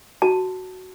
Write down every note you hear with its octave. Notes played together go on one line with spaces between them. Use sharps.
F#4 A5